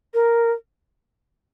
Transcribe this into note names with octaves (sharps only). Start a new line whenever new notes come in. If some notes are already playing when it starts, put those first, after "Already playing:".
A#4